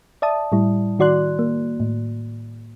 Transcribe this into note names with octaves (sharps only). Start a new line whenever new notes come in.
D5 E5 A5 D#6
A2 G3 E4
D#3 F#4 D5 C6 F#6
A#3
A2